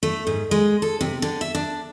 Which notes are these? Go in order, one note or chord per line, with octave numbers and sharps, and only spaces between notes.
A3
G#2
G#3
A4
C3
D3
E5
D4